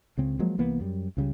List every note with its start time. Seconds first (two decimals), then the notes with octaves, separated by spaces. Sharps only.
0.17 C#2 C#3 C4 C#4
0.39 F3 F#3 G#3 A#3
0.58 C2 E3 A#3 B3
0.80 F#2 G3
1.17 C#2 C#3 G3